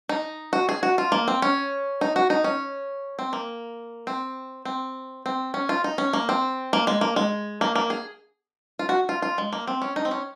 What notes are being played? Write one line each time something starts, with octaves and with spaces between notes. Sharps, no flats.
D#4
F#4
G#4
F#4
F4
A#3
C4
C#4
D#4
F#4
D#4
C#4
C4
A#3
C4
C4
C4
C#4
F4
D#4
C#4
A#3
C4
A#3
G#3
A#3
G#3
A#3
A#3
G#4
F4
F#4
F4
F4
G#3
A#3
C4
C#4
D#4
C4
C#4